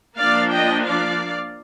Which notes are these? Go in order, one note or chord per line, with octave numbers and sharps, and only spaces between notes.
F3 A#3 D4 D5 F5
D#5 G5
D5 F5